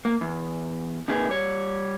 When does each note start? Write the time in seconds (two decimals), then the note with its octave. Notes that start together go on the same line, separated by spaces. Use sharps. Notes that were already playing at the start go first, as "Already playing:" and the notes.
0.05 A#3
0.21 E2
1.08 D#2 C3 A#3 D#4 G#4 B4
1.29 G3 C#5